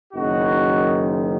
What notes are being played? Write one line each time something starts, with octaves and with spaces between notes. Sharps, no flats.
F#1 F#2 D#3 D#4 F#4